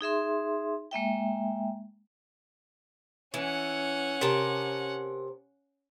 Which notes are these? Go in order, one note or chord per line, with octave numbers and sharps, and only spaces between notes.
D#4 G#4 E5 C6
G#3 A#3 E5 G5
E3 C#4 F#5
C3 A#4 A5